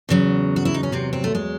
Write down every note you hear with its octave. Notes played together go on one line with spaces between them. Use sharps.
E2 C#3 F#3
F#4
E4
D#4
C#4
C3 C4
C4
A3
G#3